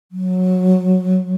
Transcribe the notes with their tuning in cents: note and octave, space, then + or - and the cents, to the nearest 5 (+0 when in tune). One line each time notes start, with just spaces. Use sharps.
F#3 -15